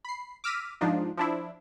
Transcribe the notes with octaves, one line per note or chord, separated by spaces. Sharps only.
B5 C7
D6 E6 F6 A#6 B6 D#7
G#2 F3 D4 D#4 F4
F3 D4 E4